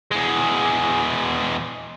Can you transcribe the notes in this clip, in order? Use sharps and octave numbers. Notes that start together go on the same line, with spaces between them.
E2 G#3